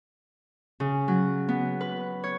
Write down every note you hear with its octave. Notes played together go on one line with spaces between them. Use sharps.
C#3
F#3
B3
B4
C#5